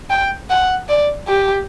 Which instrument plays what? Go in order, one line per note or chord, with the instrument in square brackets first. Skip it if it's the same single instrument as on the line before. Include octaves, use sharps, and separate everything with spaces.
[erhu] G5
F#5
D5
G4